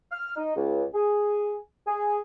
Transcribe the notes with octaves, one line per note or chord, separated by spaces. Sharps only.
F6
D#4
C#2
G#4
G#4